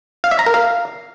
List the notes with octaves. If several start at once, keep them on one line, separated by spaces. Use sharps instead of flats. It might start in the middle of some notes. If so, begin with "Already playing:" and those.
F5
E5
A#5
A#4
F5